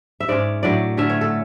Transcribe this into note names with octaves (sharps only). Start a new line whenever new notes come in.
E5
G#2 G#3 C#4 D5
A2 F#3 A3 D4 D5
D3 A3 C#4 E5
C#5
A4